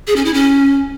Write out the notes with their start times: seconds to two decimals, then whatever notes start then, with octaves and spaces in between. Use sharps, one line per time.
0.07 G#4
0.16 C#4
0.25 E4
0.34 C#4